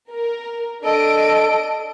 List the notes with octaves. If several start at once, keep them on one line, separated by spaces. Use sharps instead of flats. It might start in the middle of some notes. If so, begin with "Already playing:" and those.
A#4
D4 A4 D#5 D7